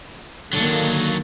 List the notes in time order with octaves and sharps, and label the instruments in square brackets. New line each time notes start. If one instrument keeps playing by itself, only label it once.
[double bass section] D3 D#3 A#3 [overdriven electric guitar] F#3 D4